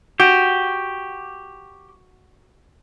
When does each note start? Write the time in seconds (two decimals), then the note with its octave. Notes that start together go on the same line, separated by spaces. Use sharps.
0.20 F#4 G4